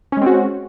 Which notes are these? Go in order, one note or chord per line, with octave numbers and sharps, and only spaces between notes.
G#3 C4 C#4 F#4